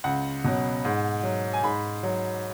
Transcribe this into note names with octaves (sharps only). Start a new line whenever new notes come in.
C#2 F#5
B2 F#3
G#2
F#3
G#5
G#2 B5
F#3